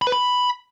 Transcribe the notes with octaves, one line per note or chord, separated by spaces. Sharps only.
B5
B4
B5